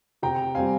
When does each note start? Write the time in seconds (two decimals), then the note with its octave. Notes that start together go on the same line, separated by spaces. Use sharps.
0.22 C3 G5 A#5
0.55 G3 C4 F5 G#5